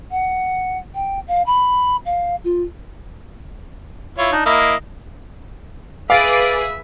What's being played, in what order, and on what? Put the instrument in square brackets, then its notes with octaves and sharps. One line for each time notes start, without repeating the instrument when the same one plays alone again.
[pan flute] F#5
G5
F5
B5
F5
F4
[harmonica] E4 F4 C#5
[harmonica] D4 [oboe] D#4
[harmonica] A#3 E4 [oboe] D#5
[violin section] G#4 B4 [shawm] E5 [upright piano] F5 [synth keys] D6 A6 D7